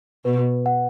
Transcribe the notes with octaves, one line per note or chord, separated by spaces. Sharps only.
B2 B4
F#5